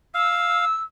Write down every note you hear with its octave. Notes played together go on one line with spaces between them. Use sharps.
F5 E6